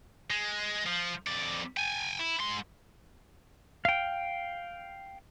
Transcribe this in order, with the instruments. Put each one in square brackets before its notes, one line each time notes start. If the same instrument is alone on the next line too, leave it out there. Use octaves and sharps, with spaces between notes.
[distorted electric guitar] G#3
F3
F2 D5
G5 G#5
E4
G#2 C6
[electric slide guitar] F5 G5